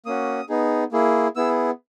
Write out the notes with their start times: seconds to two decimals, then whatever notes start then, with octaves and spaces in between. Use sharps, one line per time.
0.06 A#3 C#4 F#4 D#6
0.49 B3 D#4 G#4
0.92 A#3 E4 G#4
1.36 B3 E4 G#4 E6